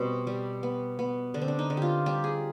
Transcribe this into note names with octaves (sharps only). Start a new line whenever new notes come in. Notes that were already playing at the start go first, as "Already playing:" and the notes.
Already playing: B2 G3 C4
G3
B3
B3
D3 D4
C4
D4
D#4
D3
F4 G4
G3 G4
G#4